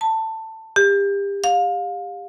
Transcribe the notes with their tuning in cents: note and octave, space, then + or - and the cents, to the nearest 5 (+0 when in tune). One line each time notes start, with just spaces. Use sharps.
A5 +15
G4 +30
F5 +25